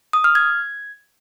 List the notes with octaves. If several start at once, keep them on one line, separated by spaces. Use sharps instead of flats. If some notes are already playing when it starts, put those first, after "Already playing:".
D#6
F6
G#6